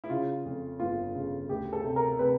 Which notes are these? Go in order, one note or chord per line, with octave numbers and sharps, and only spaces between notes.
E4
C#3 F4
F2
G1 F4
C#3
D2 G4
A4
C3
A#4
C3 B4